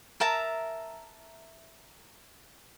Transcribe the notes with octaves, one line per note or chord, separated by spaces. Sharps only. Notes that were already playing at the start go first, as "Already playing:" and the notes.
A#4 E5 A5 A#5